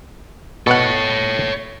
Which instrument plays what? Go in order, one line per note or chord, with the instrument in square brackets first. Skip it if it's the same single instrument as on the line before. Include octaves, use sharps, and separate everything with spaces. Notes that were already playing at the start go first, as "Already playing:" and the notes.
[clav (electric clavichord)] B2 F#5 [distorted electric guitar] A4 C#5